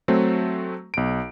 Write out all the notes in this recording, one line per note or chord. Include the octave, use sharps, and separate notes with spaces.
F#3 A3 C4
B1 D7